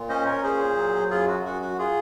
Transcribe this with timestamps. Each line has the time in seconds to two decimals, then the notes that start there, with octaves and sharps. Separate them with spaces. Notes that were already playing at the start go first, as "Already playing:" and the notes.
Already playing: A#2
0.09 C#4 C5 D#5
0.26 A#4 C#5
0.43 A#2 G#4 C5
0.77 F#3
1.10 F#2 F4 G#4
1.27 F#4
1.45 F#2 F#4
1.62 F#4
1.78 F4 G#4